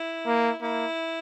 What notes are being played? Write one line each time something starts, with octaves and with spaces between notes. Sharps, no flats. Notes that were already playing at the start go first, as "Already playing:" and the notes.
Already playing: E4
A#3
A#3 E4